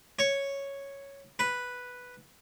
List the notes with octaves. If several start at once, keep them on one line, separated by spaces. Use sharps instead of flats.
C#5
B4